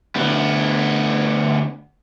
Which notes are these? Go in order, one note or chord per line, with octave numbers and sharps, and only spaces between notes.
D2 B3